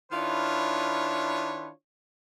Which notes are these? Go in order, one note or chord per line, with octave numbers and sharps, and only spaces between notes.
D#3 D4 E4 F4 B4 C#5